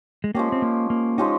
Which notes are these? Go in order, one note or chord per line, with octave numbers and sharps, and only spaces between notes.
G#3
F3 G#3 A#3 C#4 G4
C4
A#3
A#3
F3 G#3 C#4 D#4 G4